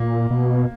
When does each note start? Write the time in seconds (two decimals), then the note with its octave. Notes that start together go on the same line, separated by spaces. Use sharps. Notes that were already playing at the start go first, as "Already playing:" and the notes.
Already playing: A#2 A#3
0.30 B2